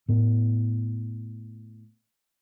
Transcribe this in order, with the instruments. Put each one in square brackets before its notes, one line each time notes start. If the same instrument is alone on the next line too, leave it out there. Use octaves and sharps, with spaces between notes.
[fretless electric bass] A2 B3